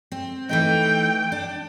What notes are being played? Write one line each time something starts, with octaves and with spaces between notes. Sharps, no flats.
C4
E3 A3 D#4 G5
D4